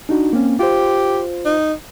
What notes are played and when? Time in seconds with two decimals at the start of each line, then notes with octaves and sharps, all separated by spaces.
0.09 D4 D#4 F#4
0.33 A#3 C4 C#4
0.59 F4 G4 C5
1.45 D#4